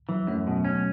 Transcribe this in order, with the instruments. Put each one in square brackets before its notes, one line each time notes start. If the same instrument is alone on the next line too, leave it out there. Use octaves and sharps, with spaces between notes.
[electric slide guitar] E3 [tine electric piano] F#3
[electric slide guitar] F#2 [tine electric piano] A3
[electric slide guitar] B2
C#4